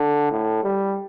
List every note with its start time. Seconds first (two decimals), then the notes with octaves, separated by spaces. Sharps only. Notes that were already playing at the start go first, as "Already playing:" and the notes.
Already playing: D3
0.31 A2
0.64 G3